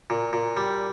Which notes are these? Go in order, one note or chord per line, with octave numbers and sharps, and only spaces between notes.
A#2
A#2
G3